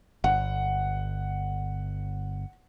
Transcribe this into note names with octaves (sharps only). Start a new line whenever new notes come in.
G1 F#5